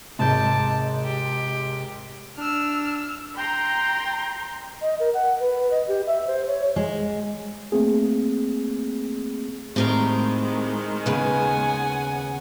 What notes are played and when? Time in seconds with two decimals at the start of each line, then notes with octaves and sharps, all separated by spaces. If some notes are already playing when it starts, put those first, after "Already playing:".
0.19 G#1 G#2 C3 G#3 A5 D6 G6
1.05 G4
2.38 D4 E6 F6
3.36 G5 A#5 C6
4.82 D#5
5.00 A#4
5.14 F#5
5.40 B4
5.71 D#5
5.88 G4
6.07 E5
6.27 C5
6.48 C#5
6.76 G#3
7.72 A3 A#3 C4 G#4
9.76 A2 D#3 G#3 C4 G4 A#4
11.06 D#2 C#3 B3 B4 F#5 G#5